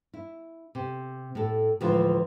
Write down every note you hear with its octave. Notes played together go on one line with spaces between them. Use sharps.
E4
C3
A2 A4
D2 A2 E3 F3 G#3 F4